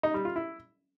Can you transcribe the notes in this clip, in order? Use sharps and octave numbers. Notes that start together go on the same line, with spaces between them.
D#4
G3
F4
E4